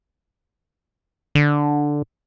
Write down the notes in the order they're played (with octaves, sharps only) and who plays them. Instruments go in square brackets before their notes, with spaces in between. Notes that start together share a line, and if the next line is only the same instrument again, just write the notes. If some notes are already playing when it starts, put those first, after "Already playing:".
[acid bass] D3